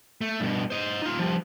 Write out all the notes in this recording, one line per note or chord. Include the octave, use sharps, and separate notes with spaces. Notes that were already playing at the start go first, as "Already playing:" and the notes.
A3
G2 B2
C5 D#5
D#4 F4
F3 G3